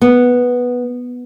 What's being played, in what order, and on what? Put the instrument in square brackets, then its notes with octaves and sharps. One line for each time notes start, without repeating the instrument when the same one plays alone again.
[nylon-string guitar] B3